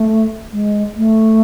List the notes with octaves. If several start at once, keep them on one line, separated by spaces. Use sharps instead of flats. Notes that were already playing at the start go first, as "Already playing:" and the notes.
Already playing: A3
G#3
A3